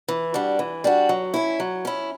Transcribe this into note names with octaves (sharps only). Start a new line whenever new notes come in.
E3
G3 D4 F#4
E3
G3 D4 F#4
F#3
C#4 E4
F#3
C#4 E4